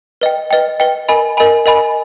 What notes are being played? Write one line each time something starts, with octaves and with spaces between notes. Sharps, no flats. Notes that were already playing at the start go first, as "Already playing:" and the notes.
B4 D#5 G5
B4 D#5 G5
B4 D#5 G5
A#4 D#5 G#5 B5
A#4 D#5 G#5 B5
A#4 D#5 G#5 B5